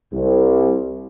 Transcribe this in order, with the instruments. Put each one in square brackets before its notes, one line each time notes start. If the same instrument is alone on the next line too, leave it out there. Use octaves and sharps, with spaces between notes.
[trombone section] C2